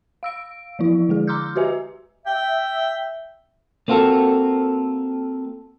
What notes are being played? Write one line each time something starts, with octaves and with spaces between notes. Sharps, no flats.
F5 E6 D7
E3 F3 E4
D3 G#3 G#4
A#5 C6 D6 E6 F6 G6
F#4 G4 B4 D#5 E5 G#5
E5 G5
A#3 C4 F4 F#4 A4